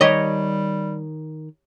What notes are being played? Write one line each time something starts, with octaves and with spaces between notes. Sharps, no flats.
D#3 G3 G4 C#5 D#5